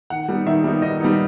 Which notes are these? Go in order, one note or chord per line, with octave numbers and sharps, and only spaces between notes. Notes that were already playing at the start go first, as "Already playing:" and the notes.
D#3 F#5
G3 B3 D#4
D#3 E5
G3 B3 D#4
D#3 D#5
G3 B3 D#4